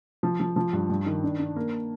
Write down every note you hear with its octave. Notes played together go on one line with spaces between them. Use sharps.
F3
F3
F3
G2
G2
D#3
D4
D4
A#3